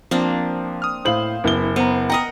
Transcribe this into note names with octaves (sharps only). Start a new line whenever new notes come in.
F3 A#3 C4 D4
D#6 F6
A2 C5 F5 F#7
F#1 B3 E4 G7
B3 C5 A#5
A#4 D#5 F#5 G5 A#5 D#6